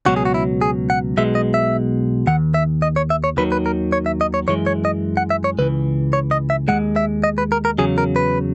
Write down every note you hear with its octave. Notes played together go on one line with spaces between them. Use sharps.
C#2 B2 F#3 F#4
G#4
F#4
E4
G#4
F#5
B1 B2 G#3 E5
D#5
E5
D#2 D#3 F#5
E5
D#5
C#5
E5
C#5
D#2 D#3 F#3 B4
B4
A#4
C#5
E5
D#5
C#5
F#2 E3 G#3 C#5
C#5
D#5
F#5
E5
C#5
C#2 C#3 E3 B4
C#5
D#5
E5
D#2 D#3 G#3 F#5
E5
D#5
B4
A#4
A#4
E2 C#3 F#3 G#4
A#4
B4